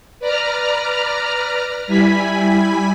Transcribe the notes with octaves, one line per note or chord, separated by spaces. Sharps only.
B4 D5 A#5 F6
G3 E4 G#5 B5 B6